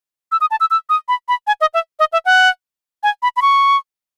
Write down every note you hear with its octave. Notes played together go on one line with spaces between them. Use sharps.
E6
D#6
A5
E6
E6
D#6
B5
B5
G#5
D#5
E5
D#5
E5
F#5
G#5
B5
B5
C#6